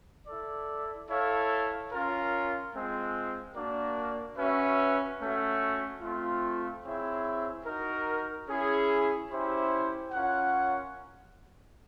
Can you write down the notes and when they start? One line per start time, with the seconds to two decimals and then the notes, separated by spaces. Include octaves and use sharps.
0.26 E4 A4 D5
1.09 E4 A4 C#5 F5
1.90 C#4 F4 A#4
2.73 G#3 C4 F4
3.55 A#3 D4 F#4 A#4 D5
4.37 C#4 F#4 B4 E5
5.19 A3 C#4 F#4
6.02 A3 C4 F4
6.84 C4 E4 G#4 C#5 E5
7.65 D#4 F#4 A#4
8.48 C#4 E4 G#4
9.30 C#4 E4 G4 C5 E5
10.12 C#4 F4 A#4 C#5 F#5